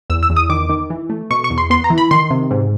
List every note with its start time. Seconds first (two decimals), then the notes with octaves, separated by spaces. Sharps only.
0.10 E2 E6
0.23 E6
0.30 E2
0.37 D#6
0.50 D#3 D6
0.69 D#3
0.90 E3
1.10 A3
1.30 B2 C#6
1.44 C#6
1.50 E2
1.58 C6
1.70 B3 C6
1.84 A#5
1.90 E3
1.98 B5
2.11 D#3 C6
2.31 C3
2.51 G#2